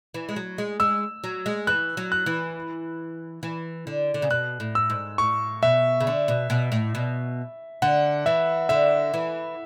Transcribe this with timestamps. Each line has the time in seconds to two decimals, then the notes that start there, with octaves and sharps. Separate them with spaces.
0.14 E3
0.29 G#3
0.36 F#3
0.58 G#3
0.80 G#3 E6
1.24 F#3
1.46 G#3
1.67 E3 F#6
1.97 F#3
2.12 F#6
2.26 E3
3.43 E3
3.87 D3
4.14 D3
4.22 C#3
4.30 B2 F#6
4.60 A2
4.75 E6
4.90 G#2
5.18 A2 C#6
5.62 B2 E5
6.00 C#3
6.07 D3
6.28 B2
6.50 B2
6.72 A2
6.95 B2
7.82 D3 F#5
8.26 E3 E5
8.69 D3 E5
9.14 E3